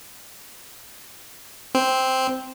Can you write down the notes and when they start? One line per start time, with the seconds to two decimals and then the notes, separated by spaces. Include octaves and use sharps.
1.75 C4